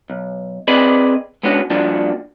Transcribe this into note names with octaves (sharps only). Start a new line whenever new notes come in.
B1
C4 G#4 B4 D5 D#5 B5
G#3 B3 C#4 D4 F#4
G2 F3 A#3 D4 F#4